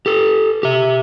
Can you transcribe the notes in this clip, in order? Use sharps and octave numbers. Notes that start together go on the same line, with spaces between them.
G4 A4
G4 E5